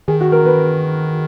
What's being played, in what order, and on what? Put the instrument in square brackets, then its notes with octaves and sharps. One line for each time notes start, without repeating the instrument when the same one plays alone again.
[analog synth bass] D#3 [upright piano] G#4
[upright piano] F#4
A#4
B4